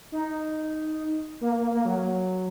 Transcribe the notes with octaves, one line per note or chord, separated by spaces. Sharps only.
D#4
A#3
A#3
A#3
F#3